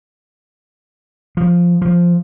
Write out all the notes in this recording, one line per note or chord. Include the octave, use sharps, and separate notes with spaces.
F3
F3